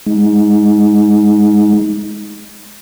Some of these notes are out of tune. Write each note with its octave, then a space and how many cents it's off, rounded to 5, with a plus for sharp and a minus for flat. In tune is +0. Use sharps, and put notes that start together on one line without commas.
G#3 +0 D#4 +20